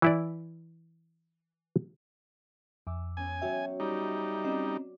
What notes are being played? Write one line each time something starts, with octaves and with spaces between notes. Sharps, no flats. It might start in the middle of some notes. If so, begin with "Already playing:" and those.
E3 E4 D5
F2 D6 E6
B3 C#4 G#5
F#3 F#4 C#5 E5 G5
G3 D#4 C#6 B6 C#7
C4 C#4 D5 D#5